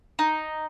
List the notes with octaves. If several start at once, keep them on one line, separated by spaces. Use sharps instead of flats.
D#4